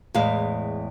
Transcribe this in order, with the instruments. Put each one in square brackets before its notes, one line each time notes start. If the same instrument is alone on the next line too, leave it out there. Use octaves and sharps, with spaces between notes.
[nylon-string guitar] E2 A2 G#3 F5